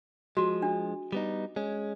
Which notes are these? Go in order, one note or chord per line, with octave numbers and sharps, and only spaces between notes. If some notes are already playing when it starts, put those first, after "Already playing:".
F3 G#3 F#4
D4
G3 B3 D#4
G#3 C#4